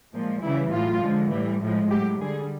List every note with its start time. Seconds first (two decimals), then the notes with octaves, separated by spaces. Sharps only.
0.12 A#2 F3 G#3
0.41 C#3 E3 G3 E4
0.71 A2 F#3 F4
1.01 D3 F3 G#3
1.31 A2 E3 G3
1.60 A2 F3 G#3
1.90 A2 F#3 G4
2.20 D3 G3 G#4